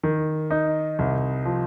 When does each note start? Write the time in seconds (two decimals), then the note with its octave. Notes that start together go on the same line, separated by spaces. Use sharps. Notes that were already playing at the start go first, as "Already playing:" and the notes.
0.04 D#3
0.51 D#4
0.99 C2
1.45 F3